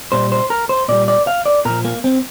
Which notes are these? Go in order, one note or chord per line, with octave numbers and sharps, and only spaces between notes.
A#2 G3 C5
C5
A#4
C5
A#2 G3 D5
D5
F5
D5
A#2 F3 A#4
A#3
C4